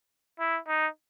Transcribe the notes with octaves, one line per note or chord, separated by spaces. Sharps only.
E4
D#4